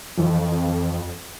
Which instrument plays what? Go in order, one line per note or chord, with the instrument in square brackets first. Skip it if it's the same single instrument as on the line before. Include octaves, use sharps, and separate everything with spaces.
[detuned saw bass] F2 [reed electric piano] E3 F3